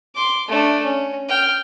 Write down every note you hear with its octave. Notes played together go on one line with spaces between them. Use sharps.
C6 D6
A3 D4
C#4
G5 F6